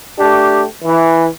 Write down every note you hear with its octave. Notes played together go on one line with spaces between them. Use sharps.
A3 D4 G4
E3